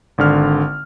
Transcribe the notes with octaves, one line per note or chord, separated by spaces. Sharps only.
G#1 D3 F6